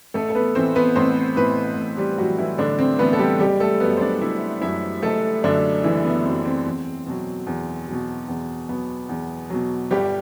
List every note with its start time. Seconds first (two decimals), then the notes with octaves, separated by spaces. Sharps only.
0.14 A1 A3 A4
0.30 A4
0.35 B3 B4
0.55 A2 E3 C4 C5
0.75 B3 B4
0.96 A1 C4 C5
1.37 A2 E3 B3 B4
1.77 A1
1.97 G3 G4
2.18 A2 E3 F#3 F#4
2.38 E3 E4
2.58 A1 D3 D4
2.79 C4
2.99 A2 E3 B3 B4
3.13 A4
3.19 G3 G4
3.39 F#1 G3 G4
3.60 A3 A4
3.80 F#2 F#3 B3 B4
3.97 C5
4.01 D4 D5
4.21 F#1 E4 E5
4.61 F#2 F#3 E4 E5
5.02 F#1 A3 A4
5.43 F#2 D3 F#3 D4
5.84 F#1 E3 E4
6.05 B3
6.24 F#2 F#3 C4
6.45 C4
6.65 E2
7.06 B2 F#3
7.47 E2
7.87 B2 F#3
8.28 E2
8.69 B2 F#3 B3
9.09 E2
9.50 B2 F#3
9.91 G1 G3 G4